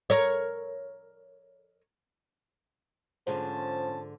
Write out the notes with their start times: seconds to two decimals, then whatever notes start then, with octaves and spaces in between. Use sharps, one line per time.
0.10 A#4 C#5
3.27 G#2 D3 F3 C#4 C5 A5